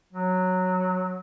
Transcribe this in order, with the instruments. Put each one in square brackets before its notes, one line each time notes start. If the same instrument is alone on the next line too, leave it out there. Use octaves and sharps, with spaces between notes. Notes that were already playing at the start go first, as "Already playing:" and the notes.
[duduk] F#3